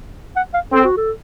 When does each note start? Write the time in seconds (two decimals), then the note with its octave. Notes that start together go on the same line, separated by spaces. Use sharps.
0.36 F#5
0.54 F5
0.73 C4 A4
0.85 F#4
0.97 A4